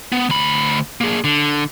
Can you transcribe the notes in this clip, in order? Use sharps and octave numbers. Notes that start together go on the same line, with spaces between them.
B3
D2 B5
A#3 G#4
D3